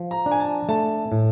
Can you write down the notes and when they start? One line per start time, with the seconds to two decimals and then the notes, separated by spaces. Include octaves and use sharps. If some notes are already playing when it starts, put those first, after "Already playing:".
Already playing: F3
0.11 A#5
0.26 D4
0.32 G#5
0.40 A5
0.69 A3 A5
1.12 A2